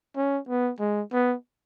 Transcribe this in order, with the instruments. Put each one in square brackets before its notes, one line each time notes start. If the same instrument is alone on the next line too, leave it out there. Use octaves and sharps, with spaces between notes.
[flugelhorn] C#4
B3
G#3
B3